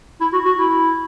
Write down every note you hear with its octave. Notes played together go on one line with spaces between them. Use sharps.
E4
F#4
F#4
E4